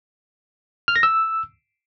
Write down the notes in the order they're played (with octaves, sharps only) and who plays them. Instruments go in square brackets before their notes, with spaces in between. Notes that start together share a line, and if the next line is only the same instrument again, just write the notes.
[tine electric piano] F6
A#6
E6